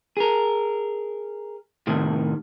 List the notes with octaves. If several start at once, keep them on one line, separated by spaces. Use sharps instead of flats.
G#4 A#4
A2 C3 D#3